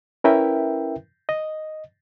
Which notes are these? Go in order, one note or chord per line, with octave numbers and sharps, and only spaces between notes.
C#4 E4 A#4 B4 E5 G5
D#5